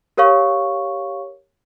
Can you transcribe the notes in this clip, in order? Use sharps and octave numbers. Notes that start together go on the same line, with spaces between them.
G4 A#4 C#5 F5 C#6